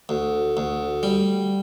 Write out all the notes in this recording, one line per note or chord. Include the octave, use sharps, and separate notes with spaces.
D2
D2
G3